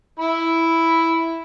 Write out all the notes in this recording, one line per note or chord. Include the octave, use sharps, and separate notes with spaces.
E4 B5